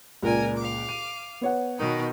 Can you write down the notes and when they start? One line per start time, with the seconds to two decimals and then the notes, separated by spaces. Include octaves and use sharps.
0.23 C#2 A#2 A#4 D5 G#5
0.56 F5 D6
0.89 D#7
1.41 B3 C#5 F#5
1.78 B2 D#3 D#4